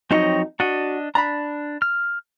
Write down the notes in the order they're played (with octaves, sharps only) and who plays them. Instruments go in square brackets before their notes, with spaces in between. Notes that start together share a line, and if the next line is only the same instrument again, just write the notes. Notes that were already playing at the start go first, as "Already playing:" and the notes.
[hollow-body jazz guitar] F2 F#3 D#4 [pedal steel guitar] C4 C#5 D#5
[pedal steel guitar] D4 D#5 [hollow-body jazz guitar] F#4
[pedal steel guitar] D4 [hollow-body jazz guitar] A#5 B5
[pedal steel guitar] F6